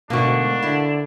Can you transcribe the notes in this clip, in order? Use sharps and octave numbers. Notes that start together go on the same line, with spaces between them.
D2 G#2 B2 A#3 D4 F#4
D3 E4